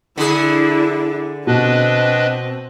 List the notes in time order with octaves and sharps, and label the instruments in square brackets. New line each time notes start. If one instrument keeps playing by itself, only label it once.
[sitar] D3 G#4 [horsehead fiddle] D4 E4
[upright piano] B2 [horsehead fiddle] C4 [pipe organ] D4 B4 D#5